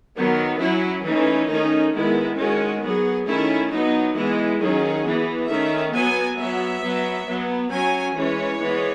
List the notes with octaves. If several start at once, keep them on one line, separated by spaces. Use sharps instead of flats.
D#3 F#3 B3
F#3 C#4 E4
E3 A3 C#4 D#4
D#3 A3 C#4 D#4
D#3 G#3 B3 E4
D#3 G#3 C#4 F#4
F#3 B3 G#4
D#3 A3 C#4 E4
F#3 B3 D#4
E3 G#3 B3 E4
D#3 F#3 C#4 G#4
E3 B3
D#3 A3 C#4 E5
F#3 B3 G#5
F#3 B3 E5
F#3 B3
F#3 B3
F#3 C#4 G#5
E3 G#3 C#4 C#5
E3 G#3 B3